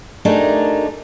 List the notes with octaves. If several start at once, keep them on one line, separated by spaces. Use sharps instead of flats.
A3 D4 D#4 G4 G#4 A#4